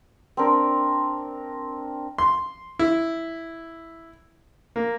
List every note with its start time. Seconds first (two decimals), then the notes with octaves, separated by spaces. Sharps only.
0.37 C4 D4 A#4
2.18 C6
2.79 E4
4.76 A#3